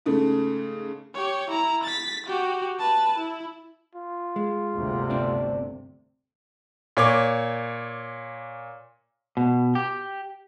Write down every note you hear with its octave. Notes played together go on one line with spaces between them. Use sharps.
G#2 C#3 A3
G4 C#5
E4 A#5
A6 B6
F#4 G4
B4 A5
E4
F4
G#3
G1 D2 C3
C4 D4
A#2 C#5 D6
B2
G4